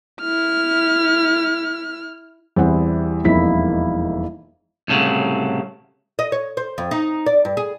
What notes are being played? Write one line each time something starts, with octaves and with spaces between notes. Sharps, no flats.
E4 F6
E2 G3 C4 E4 F#5
E1 F2 A#3 D#4 E4 B6
C2 A2 C#3 F#3
D#5
C#5
C5
F2
D#4
D5
G2
G#4